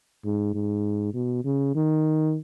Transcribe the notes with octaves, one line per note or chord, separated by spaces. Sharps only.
G#2
G#2
B2
C#3
D#3